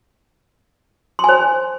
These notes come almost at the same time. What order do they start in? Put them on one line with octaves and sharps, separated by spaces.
C6 G#5 C5